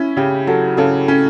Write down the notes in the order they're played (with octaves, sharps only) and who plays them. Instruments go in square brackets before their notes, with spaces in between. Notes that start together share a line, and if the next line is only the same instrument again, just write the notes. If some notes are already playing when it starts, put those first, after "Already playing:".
Already playing: [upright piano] C#4 [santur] E4
[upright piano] C#3 [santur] G4
[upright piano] F#3 [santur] A4
[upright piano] C#3 [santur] A4
[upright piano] C#4